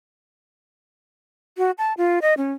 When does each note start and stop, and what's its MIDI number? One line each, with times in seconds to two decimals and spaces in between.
1.58 1.71 66
1.78 1.93 81
1.97 2.19 65
2.22 2.34 75
2.37 2.53 61